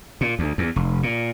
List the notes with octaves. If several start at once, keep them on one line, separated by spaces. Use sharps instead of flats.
A#2
D2
E2
F1
A#2